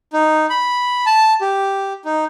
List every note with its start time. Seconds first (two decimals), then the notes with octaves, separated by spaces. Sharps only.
0.13 D#4
0.50 B5
1.06 A5
1.41 G4
2.05 D#4